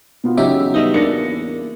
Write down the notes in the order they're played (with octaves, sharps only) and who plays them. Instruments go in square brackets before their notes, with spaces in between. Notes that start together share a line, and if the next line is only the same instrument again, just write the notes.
[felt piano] B2 B3 F4
[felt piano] E2 C#3 F#3 [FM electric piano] C#4 D#4 E5 [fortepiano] G4
[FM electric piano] G3 B3 [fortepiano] D#4 D#5 E5
[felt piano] E2 A#6 C#7 [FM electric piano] A#3 [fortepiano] D4